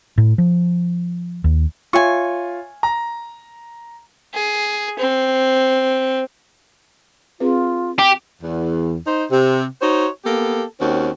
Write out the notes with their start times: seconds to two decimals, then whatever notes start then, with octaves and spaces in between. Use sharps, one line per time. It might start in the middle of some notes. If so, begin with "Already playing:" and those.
0.18 A2
0.38 F3
1.44 D#2
1.93 F4 C#5 E5 G#5 C#6
2.83 A#5
4.34 G#4
4.99 C4
7.40 C4 F4 G#4 B4
7.99 G4
8.42 E2
9.07 D#4 C5
9.31 C3
9.81 D#4 F#4 C5 C#5
10.24 A#3 B3 G4 A4
10.80 D#2 C4 C#4 F#4